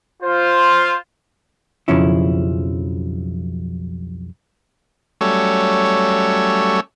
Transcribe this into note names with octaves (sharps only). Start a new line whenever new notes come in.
F4 C5
B1 F2 C#3 F3 C#4 E4
F#3 G3 A3 C#4 A4 C#5